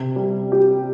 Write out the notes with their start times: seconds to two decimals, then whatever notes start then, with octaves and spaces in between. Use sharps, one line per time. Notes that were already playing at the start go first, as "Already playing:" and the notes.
Already playing: C3
0.16 G3
0.52 G4